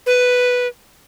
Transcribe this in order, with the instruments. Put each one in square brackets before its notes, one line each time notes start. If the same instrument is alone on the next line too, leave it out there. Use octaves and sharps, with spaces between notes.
[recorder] B4